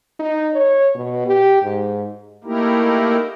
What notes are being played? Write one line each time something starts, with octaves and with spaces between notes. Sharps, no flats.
D#4
C#5
B2
G4
G#2
A3 A#3 D#4 E4 G4 A#4